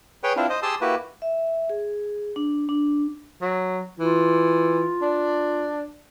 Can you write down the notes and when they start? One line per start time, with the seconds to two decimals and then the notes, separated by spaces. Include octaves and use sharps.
0.24 G#4 B4 C#5 G5
0.36 C4 D4 E4 F4
0.49 C5 D#5
0.63 G4 G#4 A5 C6 D#6 E6
0.81 A#3 E4 F#4 G4 B4
1.22 E5
1.69 G#4
2.36 D4
2.69 D4
3.42 F#3
3.99 E3 F4
5.02 D4